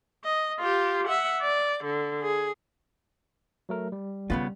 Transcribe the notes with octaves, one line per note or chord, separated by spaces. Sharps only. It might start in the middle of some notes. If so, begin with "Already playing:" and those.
D#5
F4 G4
E5 F#5
D5
D3
G#4
F#3 A3 A#4
G3
C#3 B3 C#4 F4